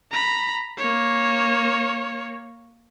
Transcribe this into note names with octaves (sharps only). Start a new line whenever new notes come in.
A#5 B5
A#3 C#5